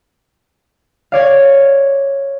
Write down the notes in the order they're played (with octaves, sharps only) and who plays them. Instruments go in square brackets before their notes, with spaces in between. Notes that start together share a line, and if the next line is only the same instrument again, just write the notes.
[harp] C#5 D5 F5